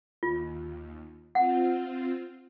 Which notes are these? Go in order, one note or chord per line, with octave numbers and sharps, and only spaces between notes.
D#2 F4
C4 F4 F#5